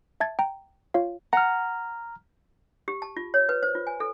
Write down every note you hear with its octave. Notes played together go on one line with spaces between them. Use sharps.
E5 A5 G#6 A6
G5 A#5
F4 C#5 F5
F#5 A#5 F6
G4
A5
F4
C#5
B4
C5
F4
G#5
A4